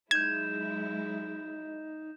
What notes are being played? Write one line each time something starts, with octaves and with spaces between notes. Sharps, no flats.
F#3 G#3 D#4 E4 G6 G#6 E7